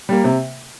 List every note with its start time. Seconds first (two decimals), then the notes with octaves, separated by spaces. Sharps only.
0.09 G3 A#3
0.24 C3